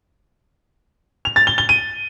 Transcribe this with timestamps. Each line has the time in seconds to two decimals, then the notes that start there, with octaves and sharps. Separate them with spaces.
1.25 F7
1.36 A6
1.47 G7
1.58 G7
1.69 D#7